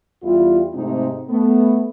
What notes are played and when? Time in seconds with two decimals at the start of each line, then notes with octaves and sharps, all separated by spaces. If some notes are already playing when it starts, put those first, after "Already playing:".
0.23 E2 G3 E4 F4
0.74 G#2 C3 A3 C4 D#4
1.30 A3 B3